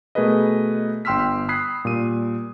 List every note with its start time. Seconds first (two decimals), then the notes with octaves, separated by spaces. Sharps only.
0.15 B2 A3 G#4 A#4 B4 D#5
1.05 G1 G5 C6 E6 F6 B6
1.49 B5 D#6 F#6 G#6 B6 C7
1.85 A#2 G3 D#7